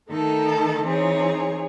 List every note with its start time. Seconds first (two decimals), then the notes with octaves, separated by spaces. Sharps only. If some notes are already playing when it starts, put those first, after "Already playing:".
0.10 D#3 A3 D#4 A4
0.82 E3 C4 D#4 G#4 C#5